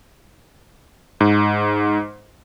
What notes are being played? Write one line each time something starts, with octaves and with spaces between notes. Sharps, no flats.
G#2